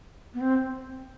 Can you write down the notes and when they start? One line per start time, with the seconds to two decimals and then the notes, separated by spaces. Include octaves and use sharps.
0.34 B3
0.41 C4